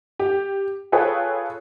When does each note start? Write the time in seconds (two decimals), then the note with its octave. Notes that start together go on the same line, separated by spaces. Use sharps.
0.19 G4
0.92 F4 G#4 A4 B4 C#5 G5